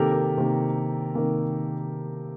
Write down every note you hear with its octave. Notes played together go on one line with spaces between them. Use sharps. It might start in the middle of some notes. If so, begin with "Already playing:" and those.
Already playing: C3 D#3 A#3 G4 A4 A#4
A#4
C3 D#3 A#3
C3 D#3 A#3